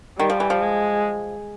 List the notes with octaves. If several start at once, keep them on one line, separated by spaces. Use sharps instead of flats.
D#3 G3
F3
E3
F3
G#3